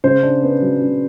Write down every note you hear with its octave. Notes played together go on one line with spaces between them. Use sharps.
C#3 C5
D4
B3
F#3
C#3